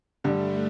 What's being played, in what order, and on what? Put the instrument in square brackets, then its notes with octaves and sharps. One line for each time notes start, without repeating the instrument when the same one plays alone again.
[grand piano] G2 D3 G3 [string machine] A3